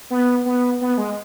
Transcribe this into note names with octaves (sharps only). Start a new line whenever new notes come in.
B3
B3
B3
G#3